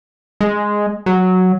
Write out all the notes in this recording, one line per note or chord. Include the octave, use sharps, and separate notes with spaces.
G#3
F#3